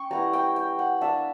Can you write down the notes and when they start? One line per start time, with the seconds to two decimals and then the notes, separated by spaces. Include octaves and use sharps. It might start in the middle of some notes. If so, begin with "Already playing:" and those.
Already playing: C#4 G5 C#6
0.11 G3 B3 E4 A#5
0.33 G5
0.56 G5
0.79 F#5
1.01 A#3 D4 E5